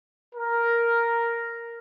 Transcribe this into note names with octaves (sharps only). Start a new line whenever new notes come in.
A#4